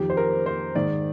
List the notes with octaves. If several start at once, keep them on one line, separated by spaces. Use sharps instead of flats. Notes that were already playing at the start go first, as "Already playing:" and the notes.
Already playing: F2 D#3 G4
C5
A#4
C5
G#2 D#3 D5